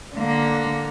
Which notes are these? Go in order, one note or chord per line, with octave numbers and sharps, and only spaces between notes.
D3 A#3